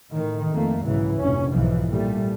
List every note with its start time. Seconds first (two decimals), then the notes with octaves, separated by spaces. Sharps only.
0.13 A2 D#3
0.51 F2 A3 A#3
0.85 B1 G#2 C#3 E3
1.19 F1 A#1 G2 C#4
1.53 B1 G#2 E3 F3
1.89 A#2 G3 A3